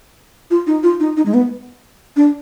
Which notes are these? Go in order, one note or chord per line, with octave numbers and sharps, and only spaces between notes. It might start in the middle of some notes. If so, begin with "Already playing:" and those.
F4
D#4
F4
D#4
D#4
G#3
B3
D4